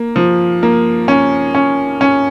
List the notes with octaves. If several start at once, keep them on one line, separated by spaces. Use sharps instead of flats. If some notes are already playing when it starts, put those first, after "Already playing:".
Already playing: A#3
F3
A#3
C#4
C#4
C#4